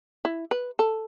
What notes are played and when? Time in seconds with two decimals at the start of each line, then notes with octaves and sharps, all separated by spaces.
0.25 E4
0.51 B4
0.79 A4